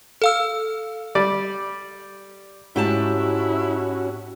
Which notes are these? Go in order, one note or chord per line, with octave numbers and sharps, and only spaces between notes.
A4 F5 E6
G3 D5
G#2 C#4 E4 F#4 G4 A5